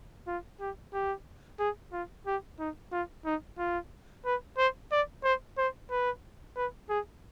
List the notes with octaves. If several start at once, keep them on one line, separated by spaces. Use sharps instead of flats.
F4
G4
G4
G#4
F4
G4
D#4
F4
D#4
F4
B4
C5
D5
C5
C5
B4
B4
G#4